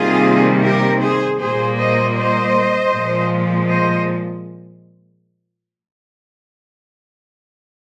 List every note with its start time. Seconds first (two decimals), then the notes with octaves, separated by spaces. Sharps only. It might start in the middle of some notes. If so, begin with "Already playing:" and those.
Already playing: C3 D#3 G3 A#3 F4 G#4
0.62 G4 A#4
1.01 G#4 C5
1.39 A#2 G3 A#3 G#4 C5
1.77 C5 D#5
2.16 C5 D#5
2.92 A#2 F3 G#3
3.68 C5 D#5